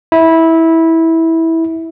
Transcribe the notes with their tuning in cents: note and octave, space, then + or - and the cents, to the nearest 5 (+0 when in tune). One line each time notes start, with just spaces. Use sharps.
E4 -15